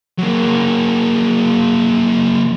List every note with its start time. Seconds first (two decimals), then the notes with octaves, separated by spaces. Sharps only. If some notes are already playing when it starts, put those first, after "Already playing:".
0.18 F#3 A#3